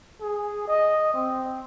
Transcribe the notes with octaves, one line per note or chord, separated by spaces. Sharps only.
G#4
D#5
C4